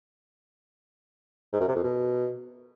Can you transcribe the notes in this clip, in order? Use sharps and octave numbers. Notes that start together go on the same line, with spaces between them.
G#2
F#2
C3
F2
B2